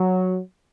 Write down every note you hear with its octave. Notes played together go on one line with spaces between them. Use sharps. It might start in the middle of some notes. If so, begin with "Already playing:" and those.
Already playing: F#3